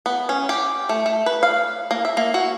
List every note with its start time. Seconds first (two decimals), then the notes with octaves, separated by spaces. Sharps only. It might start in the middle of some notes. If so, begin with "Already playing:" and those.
0.06 B3
0.29 C#4
0.49 G4
0.89 A3
1.06 A3
1.26 B4
1.43 F5
1.91 A#3
2.05 E5
2.17 A#3
2.34 F#4